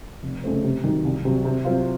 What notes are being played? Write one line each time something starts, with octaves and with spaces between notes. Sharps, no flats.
F1
F2 C#3 A3 C4
C3
D#3 F#3
C2
C3 F#3
C3
F#3 C4 F4